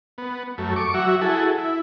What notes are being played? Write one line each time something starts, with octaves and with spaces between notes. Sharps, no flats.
B3
F#2 A3
C#6 D6
F#3 F#4 E5
E4 F#4 G#4 A4
E4